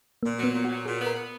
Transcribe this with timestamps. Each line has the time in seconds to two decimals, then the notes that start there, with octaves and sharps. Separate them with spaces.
0.23 A#2 A#3
0.38 F#3
0.43 B3
0.54 A#2
0.65 F#3 F#4
0.86 A#2 G#4
1.01 B3
1.06 A#4
1.16 B3